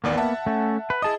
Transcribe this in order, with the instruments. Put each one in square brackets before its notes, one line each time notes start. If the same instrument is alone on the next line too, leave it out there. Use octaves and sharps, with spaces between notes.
[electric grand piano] A1 D#2 D5 [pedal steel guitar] A#3 B3
[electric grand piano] E5 F#5 A5
[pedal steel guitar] A3 C#4
B4
[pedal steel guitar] E4 A5 D#6 [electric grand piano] G#4 D#5